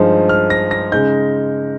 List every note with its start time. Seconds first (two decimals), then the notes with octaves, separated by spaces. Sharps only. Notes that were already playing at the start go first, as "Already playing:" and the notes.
Already playing: G2 F3 G#3 D#4
0.29 F6
0.50 A#6
0.71 A#6
0.92 C#3 G#3 D#4 G6